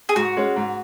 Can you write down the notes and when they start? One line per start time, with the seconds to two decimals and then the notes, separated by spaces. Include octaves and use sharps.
0.09 G#4
0.16 G#2 F#4
0.37 G#3 C#4
0.56 G#2